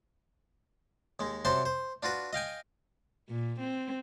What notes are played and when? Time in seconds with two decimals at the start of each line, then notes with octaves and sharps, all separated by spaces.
1.19 D#2 G#3
1.45 F#2 C3 C5 F#5 A5 C6
1.65 C5
2.03 D4 F4 F#4 B4
2.33 D#5 F5 G5 G#5
3.29 A#2
3.60 C4